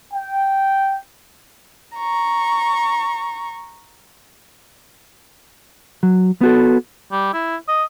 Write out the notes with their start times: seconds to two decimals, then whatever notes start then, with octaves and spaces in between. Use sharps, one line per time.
0.13 G5
1.97 A#5 C#6
6.03 F#3
6.41 B3 F#4 A4
7.11 G3
7.33 E4
7.68 D#5